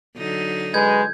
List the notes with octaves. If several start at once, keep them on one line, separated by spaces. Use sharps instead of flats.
D3 F#3 D#4
G#3 B4 G6 G#6